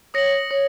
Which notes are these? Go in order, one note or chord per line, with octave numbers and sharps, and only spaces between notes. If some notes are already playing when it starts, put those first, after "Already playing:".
C#5 D#6 A#6 C#7 F#7
C#5